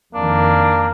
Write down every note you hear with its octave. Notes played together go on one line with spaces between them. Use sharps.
F2 D#3 A#3 D4